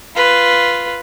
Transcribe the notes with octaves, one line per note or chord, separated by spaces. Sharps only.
F4 B4